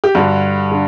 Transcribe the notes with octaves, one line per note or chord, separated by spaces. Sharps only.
G4
G2 D3 F#4
D3